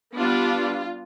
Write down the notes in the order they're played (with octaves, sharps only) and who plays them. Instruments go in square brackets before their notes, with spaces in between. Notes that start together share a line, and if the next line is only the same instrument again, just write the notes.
[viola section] G3 B3 D4 F4